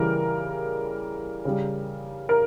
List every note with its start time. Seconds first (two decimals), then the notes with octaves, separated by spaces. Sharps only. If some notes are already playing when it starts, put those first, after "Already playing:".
Already playing: C#3 E3 G3 A#4
1.45 C#3 G3
2.29 A#4